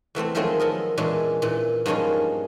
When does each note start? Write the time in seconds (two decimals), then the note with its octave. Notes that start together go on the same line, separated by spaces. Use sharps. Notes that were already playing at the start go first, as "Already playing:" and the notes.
0.15 E2 E3 A3 C4
0.35 D#3 F3 F#3 G#3 A3 C4
0.60 B3 A4 A#4 D#5
0.97 E2 A#2 E3 G#3 C#4 D4
1.42 A#2 E3
1.86 G2 F3 G#3 A#3 C#4 D#4